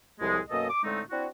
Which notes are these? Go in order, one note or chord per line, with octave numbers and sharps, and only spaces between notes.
C2 A2 F3 G#3
F#2 B2 A#3 A4 D#5
D6
A2 D3 G#3 A3 C4 D#4
C4 D4 E4 F#4